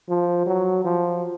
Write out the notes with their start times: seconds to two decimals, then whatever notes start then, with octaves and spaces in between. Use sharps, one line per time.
0.09 F3
0.47 F#3
0.84 F3